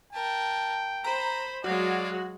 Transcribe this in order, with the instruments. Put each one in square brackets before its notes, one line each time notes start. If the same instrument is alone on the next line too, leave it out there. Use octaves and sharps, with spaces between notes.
[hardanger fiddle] A#4 A5 [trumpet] G5
[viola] C5 [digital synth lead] A#5 [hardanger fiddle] B5
[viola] F#3 G#3 [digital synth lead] F#4 [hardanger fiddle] C#5 F5 [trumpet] D5